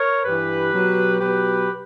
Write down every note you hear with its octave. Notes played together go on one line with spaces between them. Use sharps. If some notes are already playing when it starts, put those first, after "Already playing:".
Already playing: A#4 C#5
G2 E3 G4 B4
B2 F#3
B2 F#3 G4 B4